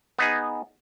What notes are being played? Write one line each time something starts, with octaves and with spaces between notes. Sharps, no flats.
B3 D#4 G#4